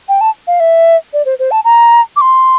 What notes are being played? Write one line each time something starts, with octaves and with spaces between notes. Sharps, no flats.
G5
A5
F5
E5
D5
C5
C5
A5
A#5
D6
C6